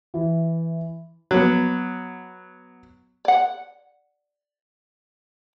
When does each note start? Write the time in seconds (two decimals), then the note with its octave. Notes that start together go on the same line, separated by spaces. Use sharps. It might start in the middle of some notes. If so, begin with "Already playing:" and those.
0.14 E3
1.31 F#3 B3
3.25 D5 F#5